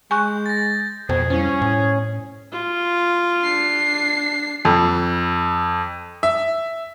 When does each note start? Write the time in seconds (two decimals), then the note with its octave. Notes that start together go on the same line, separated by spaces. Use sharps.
0.11 G#3 G#5 C#6 F#6 G6
0.46 A6 A#6
1.09 F2 B2 G#4 C5 G5
1.30 G3 C#4 E4 C5
1.62 A2
2.52 F4
3.43 D4 C7
4.65 F2
6.23 E5